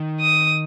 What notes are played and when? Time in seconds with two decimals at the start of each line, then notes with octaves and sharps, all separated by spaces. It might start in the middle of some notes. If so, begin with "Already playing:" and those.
Already playing: D#3
0.21 D#6